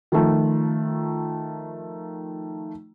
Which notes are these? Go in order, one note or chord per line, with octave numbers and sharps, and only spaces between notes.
D#3 F3 A3